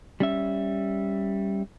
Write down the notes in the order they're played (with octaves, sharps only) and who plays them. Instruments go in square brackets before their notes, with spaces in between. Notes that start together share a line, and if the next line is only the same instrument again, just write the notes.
[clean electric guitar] G3 C#4 E5